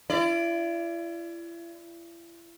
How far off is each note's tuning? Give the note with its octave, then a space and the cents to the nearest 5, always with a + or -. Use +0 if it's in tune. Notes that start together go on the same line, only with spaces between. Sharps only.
E4 +40 D5 +0